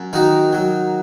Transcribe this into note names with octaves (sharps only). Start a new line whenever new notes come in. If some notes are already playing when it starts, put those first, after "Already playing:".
Already playing: F#2
D#3 D#4 F#4
F#3